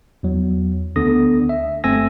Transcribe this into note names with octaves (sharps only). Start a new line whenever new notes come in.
E2 F#3
D2 D3 B3 D#6 A#6
E5
G1 A3 C4 G#5 E6 A#6